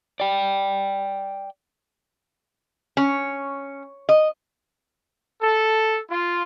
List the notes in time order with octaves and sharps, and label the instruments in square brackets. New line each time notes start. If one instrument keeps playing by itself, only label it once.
[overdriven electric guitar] D5 G5
[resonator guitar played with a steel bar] C#4
D#5
[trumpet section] A4
F4